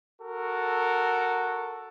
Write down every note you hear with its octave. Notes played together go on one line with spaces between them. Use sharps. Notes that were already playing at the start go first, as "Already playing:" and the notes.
F#4 A4 A#4